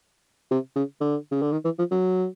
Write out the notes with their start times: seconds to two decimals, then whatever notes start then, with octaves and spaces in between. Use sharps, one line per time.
0.51 C3
0.76 C#3
1.01 D3
1.31 C#3
1.42 D3
1.52 D#3
1.65 E3
1.79 F3
1.91 F#3